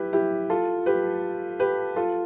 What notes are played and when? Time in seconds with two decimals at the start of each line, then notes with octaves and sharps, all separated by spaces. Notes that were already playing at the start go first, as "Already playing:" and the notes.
Already playing: E4 G4 B4
0.13 E4 G4
0.50 F4 A4
0.86 G4 B4
1.60 G4 B4
1.96 F4 A4